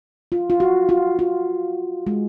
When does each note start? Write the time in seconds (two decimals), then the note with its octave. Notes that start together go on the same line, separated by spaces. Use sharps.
0.32 F4
0.50 F4
0.60 F#4
0.89 F4
1.19 F4
2.07 G#3